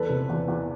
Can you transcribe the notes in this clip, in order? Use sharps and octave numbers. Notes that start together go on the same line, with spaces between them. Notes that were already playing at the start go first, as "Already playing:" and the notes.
Already playing: E2 A4 B4
C3
E2
E2